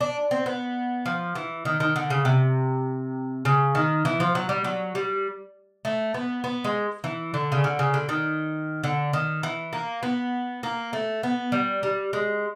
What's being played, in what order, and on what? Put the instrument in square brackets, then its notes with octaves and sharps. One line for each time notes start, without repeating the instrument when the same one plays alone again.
[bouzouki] D4
C4
B3
F3
E3
D#3
D#3
D3
C#3
C3
C#3
D#3
E3
F3
F#3
G3
F#3
G3
A3
B3
B3
G#3
E3
D3
C#3
D3
C#3
D3
D#3
D3
D#3
E3
A#3
B3
A#3
A3
B3
G3
G3
G#3